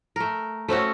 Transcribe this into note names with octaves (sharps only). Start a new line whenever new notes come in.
A3 A#4
A3 C4 C#4 F#4